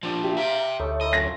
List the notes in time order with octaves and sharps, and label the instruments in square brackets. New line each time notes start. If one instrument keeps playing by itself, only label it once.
[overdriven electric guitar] F3 D4 [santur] C4 G4 G5
[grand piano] G4 [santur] E5
[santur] C4 [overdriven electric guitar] E5 G5 [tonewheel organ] F5 A#5
[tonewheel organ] D2 A4 C#5 [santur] G3 A3 D#4
[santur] E4 A#4 [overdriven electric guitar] D#5
[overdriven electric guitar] F#2 [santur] C#4 F4 [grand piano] A#6